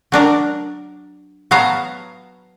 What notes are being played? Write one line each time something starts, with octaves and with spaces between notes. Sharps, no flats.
F#3 D4 A#4 A#5
F#3 B3 F5 A5 A#5